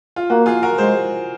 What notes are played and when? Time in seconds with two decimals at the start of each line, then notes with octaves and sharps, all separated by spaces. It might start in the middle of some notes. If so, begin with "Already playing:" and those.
0.16 F4
0.30 A#3 F#4
0.46 F4 G#4
0.62 F#4 A#4
0.78 G#3 G#4 C5